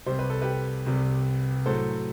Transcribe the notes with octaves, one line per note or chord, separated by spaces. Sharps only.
C2 C3 G3 C5
B4
A4
G4 B4
C2 C3 G3
A2 F#3 A3 A4 C5